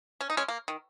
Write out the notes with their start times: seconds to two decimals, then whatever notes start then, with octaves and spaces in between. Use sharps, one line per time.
0.21 C#4
0.30 D#4
0.37 G#3 C#4
0.48 A#3
0.68 D#3